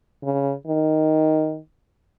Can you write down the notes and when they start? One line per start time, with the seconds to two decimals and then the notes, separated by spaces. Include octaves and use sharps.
0.23 C#3
0.67 D#3